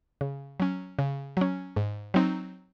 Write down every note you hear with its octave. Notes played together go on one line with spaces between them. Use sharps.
C#3
F#3 C#4
C#3
F#3 C#4
G#2
F#3 C4 D#4